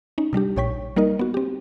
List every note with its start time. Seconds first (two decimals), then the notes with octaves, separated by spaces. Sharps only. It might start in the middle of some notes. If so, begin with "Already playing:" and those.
0.18 C#4 D#4
0.33 C3 G3 D4 G4
0.56 A#1 A#2 C#5 G5 C#6 B6
0.96 G3 A#3 D#4 A#4 D#5
1.19 B3 F#4
1.34 C4 G4